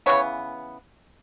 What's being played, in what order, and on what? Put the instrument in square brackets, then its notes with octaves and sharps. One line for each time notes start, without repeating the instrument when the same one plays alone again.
[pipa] C#3 E3 G3 B3 C#5